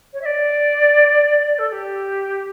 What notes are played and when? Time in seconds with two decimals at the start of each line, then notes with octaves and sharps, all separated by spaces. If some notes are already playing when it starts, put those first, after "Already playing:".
0.13 C#5
0.21 E5
0.26 D5
1.59 A4
1.69 A4
1.72 G4